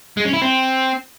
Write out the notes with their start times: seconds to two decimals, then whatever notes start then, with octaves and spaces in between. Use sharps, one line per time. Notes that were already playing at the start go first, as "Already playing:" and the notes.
0.17 G#3
0.25 C#4
0.33 E4
0.42 C4